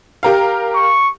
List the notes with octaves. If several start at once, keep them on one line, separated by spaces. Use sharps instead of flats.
G4 A#4 F5
C#6